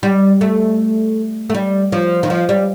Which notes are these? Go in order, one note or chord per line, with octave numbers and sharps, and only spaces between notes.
G3
A3
A3
G3
F3
D#3
F3
G3